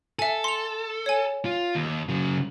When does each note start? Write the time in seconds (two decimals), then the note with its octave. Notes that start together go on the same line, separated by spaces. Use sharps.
0.19 A4 E5 G#5
0.44 C6 F7
1.06 C#5 G#5
1.45 F4
1.75 D#2
2.09 C#3 F#3